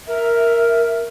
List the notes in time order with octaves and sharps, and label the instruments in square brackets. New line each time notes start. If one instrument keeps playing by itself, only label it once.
[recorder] A#4 [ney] E5